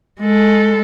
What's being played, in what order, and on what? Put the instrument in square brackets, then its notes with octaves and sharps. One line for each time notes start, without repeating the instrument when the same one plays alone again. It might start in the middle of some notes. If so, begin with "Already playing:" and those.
[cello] G#3 A4